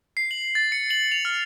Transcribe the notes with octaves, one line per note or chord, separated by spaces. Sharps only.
C7
F#7
A6
C#7
F#7
F7
F6